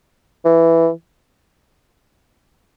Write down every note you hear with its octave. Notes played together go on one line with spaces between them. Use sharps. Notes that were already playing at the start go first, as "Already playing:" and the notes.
E3